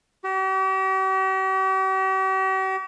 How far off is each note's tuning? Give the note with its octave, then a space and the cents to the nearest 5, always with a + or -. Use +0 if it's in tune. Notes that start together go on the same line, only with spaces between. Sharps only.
G4 -45